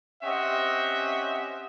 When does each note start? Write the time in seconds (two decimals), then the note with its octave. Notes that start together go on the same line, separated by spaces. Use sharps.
0.23 C4 C#4 G4 D#5 E5 F#5